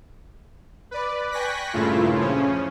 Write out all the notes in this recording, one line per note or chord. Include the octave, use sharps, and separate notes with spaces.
B4 D5
G5 G#5 C#6 F#6 A#6 B6
G2 A#2 C#3 A3 E4 F4
C#3 F3 C#4